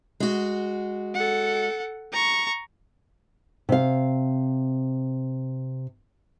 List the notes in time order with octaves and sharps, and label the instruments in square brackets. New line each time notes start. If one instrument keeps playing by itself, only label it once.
[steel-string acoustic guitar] G#3 F#4
[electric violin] A4 F#5
A#5 C#6
[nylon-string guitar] C3 F5